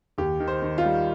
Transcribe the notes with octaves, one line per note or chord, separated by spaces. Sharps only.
D#2 G4
D#3
C5
D#3
F4
G3